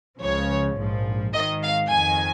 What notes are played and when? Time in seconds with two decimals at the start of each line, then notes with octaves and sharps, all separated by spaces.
0.19 C#2 C#3 F3 C#5
0.77 A#1 G#2 F3
1.33 G#1 G#2 D#3 D#5
1.62 F5
1.90 F2 D#3 G#5